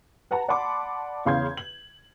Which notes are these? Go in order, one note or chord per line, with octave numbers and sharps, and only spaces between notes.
B4 F#5 A5 A#5
D5 F#5 A5 B5 C6 D6
E2 C#3 F5 C6 G6 G#6
F#7